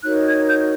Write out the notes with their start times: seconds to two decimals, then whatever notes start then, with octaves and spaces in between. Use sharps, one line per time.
0.03 D#4 F#4 A#4 C#5 F#6
0.26 G#6
0.47 G6